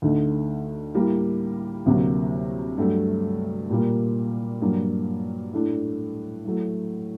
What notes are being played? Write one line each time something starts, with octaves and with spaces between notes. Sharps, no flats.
D2 D3 A3 D#4
A2 G3 A#3
D2 C3 F#3 A#3
G2 F#3 A3
A#2 G3 A#3
G2 F#3 A#3
A2 A3 D4
A2 F#3 A3